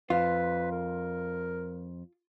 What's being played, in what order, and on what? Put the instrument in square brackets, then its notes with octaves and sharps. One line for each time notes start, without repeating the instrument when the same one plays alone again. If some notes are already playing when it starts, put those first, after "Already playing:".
[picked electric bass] F2 [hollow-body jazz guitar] F4 [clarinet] B4
[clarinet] A#4